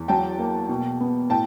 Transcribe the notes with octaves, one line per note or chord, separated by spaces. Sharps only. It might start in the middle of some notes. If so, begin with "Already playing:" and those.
Already playing: E2
F#3 G5 A5
A#3
B2
B3
A2 G5 A5